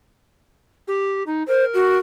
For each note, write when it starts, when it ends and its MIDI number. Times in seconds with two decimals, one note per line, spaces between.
0.87 1.23 67
1.26 1.43 63
1.48 1.98 70
1.48 1.65 72
1.74 1.98 66